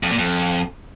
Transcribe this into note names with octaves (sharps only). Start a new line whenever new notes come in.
F2
A#2
F2